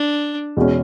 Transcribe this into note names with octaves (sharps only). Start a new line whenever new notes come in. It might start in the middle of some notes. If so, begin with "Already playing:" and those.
Already playing: D4
E2 B2 G#3 C#4